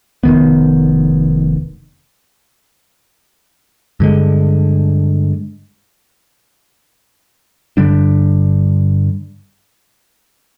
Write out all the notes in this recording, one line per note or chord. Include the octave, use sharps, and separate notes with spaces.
F1 F2 D#3 B3
G2 D3 G#3
G2 D3 G3 D4